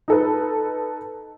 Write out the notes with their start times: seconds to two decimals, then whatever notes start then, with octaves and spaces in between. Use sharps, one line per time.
0.08 D#4 A4 B4